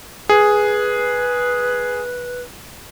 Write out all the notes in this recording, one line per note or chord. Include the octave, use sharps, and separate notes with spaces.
G#4 B4